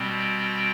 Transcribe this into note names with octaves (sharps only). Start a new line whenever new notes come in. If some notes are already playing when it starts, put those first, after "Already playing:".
Already playing: B2 G3 C4
G5